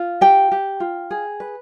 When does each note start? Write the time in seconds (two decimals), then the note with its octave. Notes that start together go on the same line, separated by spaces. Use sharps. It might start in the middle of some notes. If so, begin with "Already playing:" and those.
Already playing: F4
0.21 G4 G5
0.52 G4
0.80 F4
1.11 G#4
1.40 B4